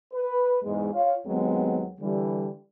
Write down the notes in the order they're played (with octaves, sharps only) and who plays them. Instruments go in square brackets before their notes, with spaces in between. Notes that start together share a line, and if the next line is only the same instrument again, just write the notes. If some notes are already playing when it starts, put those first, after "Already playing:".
[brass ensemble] B4
E2 G#2 G#3
F4 C#5 F5
D#2 F#3 G#3 B3 C4
D3 E3 G3